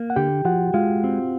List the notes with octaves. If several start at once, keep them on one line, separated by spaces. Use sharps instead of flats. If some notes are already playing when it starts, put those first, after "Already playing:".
Already playing: A#3
F#5
D3 G4 G5
F3 F#4 F#5
G#3 F4 F5
C4